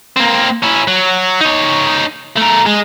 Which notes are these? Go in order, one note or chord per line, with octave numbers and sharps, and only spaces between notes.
A#3 C4
C#4 E4
F#3
D#4 C#5
A3 A#4
G#3